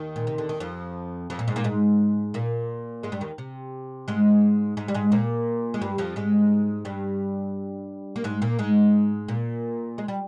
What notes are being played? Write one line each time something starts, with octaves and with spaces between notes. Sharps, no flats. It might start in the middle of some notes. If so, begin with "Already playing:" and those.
Already playing: D#2 D#3
A#2
C3
D3
D#3
F2 F3
F2 F3
A#2 A#3
G#2 G#3
A#2 A#3
G#2 G#3
A#2 A#3
G#2 G#3
G2 G3
D#2 D#3
C3
G#2 G#3
G#2 G#3
G3
G#2 G#3
A#2 A#3
G#3
G2 G3
F2 F3
G#2 G#3
G2 G3
A#3
G#2 G#3
A#2 A#3
G#2 G#3
A#2 A#3
G#3
G3